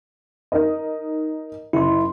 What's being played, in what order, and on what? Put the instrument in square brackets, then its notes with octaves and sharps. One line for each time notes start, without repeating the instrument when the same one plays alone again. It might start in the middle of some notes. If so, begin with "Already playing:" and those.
[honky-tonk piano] D#4 A#4 D#5
[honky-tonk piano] F#1 [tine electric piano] E4 C6